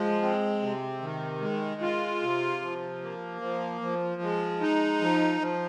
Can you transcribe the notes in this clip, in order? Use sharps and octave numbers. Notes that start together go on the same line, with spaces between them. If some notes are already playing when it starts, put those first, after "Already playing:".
Already playing: F3 G#3
C4
C3
D#3
G#3
F4
C3
F3
A#3
F3
F3
G#3
D#4
F3
F3